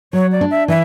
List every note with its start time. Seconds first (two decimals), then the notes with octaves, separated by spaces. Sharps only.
0.13 F#3 C#5
0.32 D5
0.41 D4
0.51 E5
0.68 E3 E5